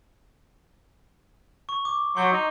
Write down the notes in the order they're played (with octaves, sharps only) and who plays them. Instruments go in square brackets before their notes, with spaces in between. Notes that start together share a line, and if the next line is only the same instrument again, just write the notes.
[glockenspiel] C#6
D6
[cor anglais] F#3 [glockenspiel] C6 G6 G7
[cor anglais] D#4